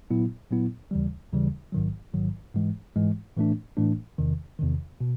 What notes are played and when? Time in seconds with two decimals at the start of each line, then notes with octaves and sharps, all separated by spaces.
0.10 A#2 F#3 B3 E4
0.51 A#2 F#3 B3 E4
0.91 D#2 C#3 E3 G3
1.33 D#2 C#3 E3 G3
1.73 A1 G#2 D#3 F#3
2.14 A1 G#2 D#3 F#3
2.55 G#2 E3 G#3
2.96 G#2 E3 G#3
3.37 A2 E3 A3 D4
3.77 A2 E3 A3 D4
4.18 E2 C3 D#3
4.59 E2 C3 D#3
5.01 B2